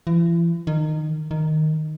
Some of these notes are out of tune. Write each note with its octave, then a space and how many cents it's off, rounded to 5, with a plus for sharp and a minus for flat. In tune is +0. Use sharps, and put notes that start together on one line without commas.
E3 +40
D#3 -20
D#3 -5